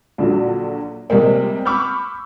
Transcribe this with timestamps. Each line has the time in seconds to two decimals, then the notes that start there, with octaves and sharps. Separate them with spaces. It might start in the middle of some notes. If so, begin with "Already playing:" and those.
0.18 A#1 D3 F#3
1.10 C3 G3 G#3 A#3 C4
1.65 B5 C#6 D6 E6 F6 G6